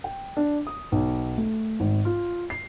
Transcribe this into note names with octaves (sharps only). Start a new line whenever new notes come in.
G5
D4
D#6
B1
A3
G#1
F4
C7